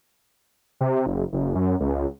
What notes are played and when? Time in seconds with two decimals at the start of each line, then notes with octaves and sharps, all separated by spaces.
0.81 C3
1.06 F#1
1.33 F#1
1.55 F#2
1.80 C#2